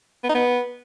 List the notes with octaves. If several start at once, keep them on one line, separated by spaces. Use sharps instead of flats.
B3
D#4
B3